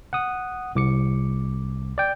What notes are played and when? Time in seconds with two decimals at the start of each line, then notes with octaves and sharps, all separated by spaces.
0.13 F#5 D#6
0.75 C2 D6 C#7
1.98 D5 G5